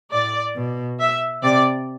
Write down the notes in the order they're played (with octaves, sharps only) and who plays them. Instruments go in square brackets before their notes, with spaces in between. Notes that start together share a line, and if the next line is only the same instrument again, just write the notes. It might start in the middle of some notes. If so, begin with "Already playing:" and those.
[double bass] A2 [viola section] D5
[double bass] B2
[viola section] E5
[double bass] C3 [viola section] D5